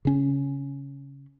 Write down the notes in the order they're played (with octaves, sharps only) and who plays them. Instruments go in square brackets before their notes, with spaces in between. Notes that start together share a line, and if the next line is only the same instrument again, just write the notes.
[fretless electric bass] C#3 C#4